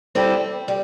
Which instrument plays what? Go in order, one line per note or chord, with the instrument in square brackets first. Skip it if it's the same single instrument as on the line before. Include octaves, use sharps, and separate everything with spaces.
[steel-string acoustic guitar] G3 C4 E4 A4
G3